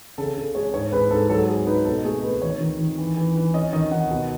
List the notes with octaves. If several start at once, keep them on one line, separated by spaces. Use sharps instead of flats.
C#3 A4
C#3 A4
G#3 C#5
G#2 C#5
G#2 B4
G#2 A4
F#3 A4
F#3 G#4
D#4 B4
B2 A4
A3 G#4
A3 B4
D#3 C#5
D#3
D#3
E3
E3
E3
C#4 D#5
D#3 D#5
D#3 F#5
B2